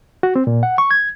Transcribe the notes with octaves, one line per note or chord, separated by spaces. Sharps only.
F#4
C4
A#2
F#5
C#6
G#6